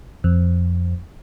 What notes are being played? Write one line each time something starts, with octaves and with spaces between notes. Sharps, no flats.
F2